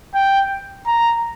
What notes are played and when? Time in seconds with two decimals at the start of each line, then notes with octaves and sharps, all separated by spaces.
0.15 G5
0.87 A#5